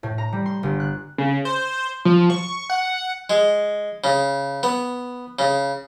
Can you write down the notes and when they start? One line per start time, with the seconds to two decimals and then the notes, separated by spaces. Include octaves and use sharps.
0.03 A2
0.18 A#5
0.33 G3
0.46 C6
0.63 G1
0.80 F#6
1.18 C#3
1.45 C5
2.05 F3
2.30 C#6
2.70 F#5
3.30 G#3
4.04 C#3
4.63 B3
5.39 C#3